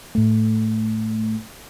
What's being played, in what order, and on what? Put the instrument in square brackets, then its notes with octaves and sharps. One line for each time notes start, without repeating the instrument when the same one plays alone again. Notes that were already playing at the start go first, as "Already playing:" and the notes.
[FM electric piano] A2 A3